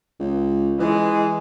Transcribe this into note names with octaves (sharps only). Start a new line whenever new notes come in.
C#2
E3 G#3